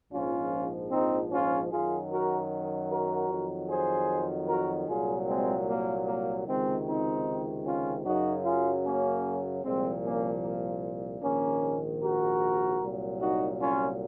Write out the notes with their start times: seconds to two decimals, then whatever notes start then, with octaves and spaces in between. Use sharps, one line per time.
0.12 A#1 G#2 F3 C#4 F4
0.92 C4 D#4
1.32 C#4 F4
1.71 F#2 D#3 F#3 F4 G#4
2.11 F#4 A#4
2.90 F#4 A#4
3.30 F2 D#3 F#3
3.69 G#4 C5
4.48 F#4 A#4
4.88 C2 A#2 F#3 F4 G#4
5.28 G#3 C4
5.67 A#3
6.07 A#3
6.47 C#2 C3 D#3 G#3 C4
6.87 C4 D#4
7.66 C#4 F4
8.05 F#2 C#3 F#3 D#4 F#4
8.45 F4 G#4
8.84 A#3 C#4
9.64 C2 A#2 F3 G#3 C4
10.03 A#3 C#4
10.43 A#3
11.22 A#1 G#2 D#3 A#3 C#4
12.02 F#4 A#4
12.81 C2 A#2 F#3
13.20 D#4 F#4
13.60 C#4 F4